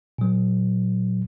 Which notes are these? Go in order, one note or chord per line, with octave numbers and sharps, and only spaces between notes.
A#2 F#3